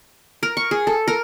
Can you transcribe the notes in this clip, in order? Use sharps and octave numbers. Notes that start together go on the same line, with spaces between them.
A#4
C#6
G#4
A4
A#4